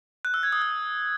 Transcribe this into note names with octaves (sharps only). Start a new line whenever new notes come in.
F#6
E6
G#6
D#6
F#6